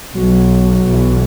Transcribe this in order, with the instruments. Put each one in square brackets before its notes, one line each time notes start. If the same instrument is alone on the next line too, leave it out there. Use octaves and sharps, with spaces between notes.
[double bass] B1 [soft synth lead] F#3
[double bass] B1 E3